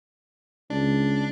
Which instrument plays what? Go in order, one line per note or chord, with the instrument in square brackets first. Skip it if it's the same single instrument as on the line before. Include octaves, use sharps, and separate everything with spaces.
[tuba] C#2 [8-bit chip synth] D4